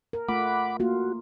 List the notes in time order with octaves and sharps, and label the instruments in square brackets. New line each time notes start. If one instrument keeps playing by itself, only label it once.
[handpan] A#4
[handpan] A3 F4 [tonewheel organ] F#5 B5 D6
[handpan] A#3 F4 [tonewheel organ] F#4